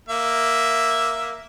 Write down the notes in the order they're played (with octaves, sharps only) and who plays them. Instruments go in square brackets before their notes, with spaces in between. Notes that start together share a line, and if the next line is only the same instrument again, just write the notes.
[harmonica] A#3 E5